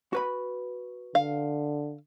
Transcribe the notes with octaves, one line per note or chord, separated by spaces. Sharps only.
F#4 B4 B5
D3 F5